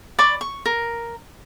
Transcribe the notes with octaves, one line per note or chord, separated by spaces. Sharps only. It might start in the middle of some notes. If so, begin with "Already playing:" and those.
D5 B5 C#6 D6
C#6
A#4